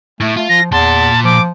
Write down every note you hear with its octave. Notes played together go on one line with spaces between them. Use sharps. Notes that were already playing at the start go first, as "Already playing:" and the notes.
A2 A3
A3 F4
F3 A#6
E2 A#2 A5 C6
F3 D6